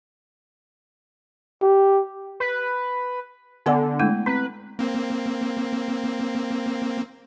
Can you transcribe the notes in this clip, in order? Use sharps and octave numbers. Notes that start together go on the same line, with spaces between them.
G4
B4
D3 B3 F#5 G#5
G#3 A3 E4
C4 B4
A#3 C4